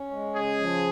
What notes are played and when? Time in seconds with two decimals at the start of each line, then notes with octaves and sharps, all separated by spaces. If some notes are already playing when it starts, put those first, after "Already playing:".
Already playing: C#4
0.11 G#3
0.35 C#3 G#4
0.59 F3